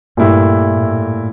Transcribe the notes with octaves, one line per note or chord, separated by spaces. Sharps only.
G2 A#2 A3 E4 G4
A2